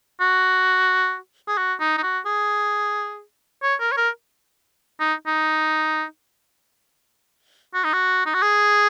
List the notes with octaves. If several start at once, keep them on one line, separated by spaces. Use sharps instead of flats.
F#4
G#4
F#4
D#4
D#4
F#4
G#4
C#5
A#4
C#5
A#4
D#4
D#4
F#4
D#4
F#4
D#4
F#4
G#4